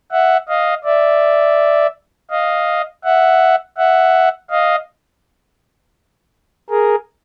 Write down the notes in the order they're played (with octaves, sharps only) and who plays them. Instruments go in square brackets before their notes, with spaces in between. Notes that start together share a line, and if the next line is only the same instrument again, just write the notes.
[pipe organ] E5 F#5
D#5 F5
D5 E5
D#5 F5
E5 F#5
E5 F#5
D#5 F5
G#4 A#4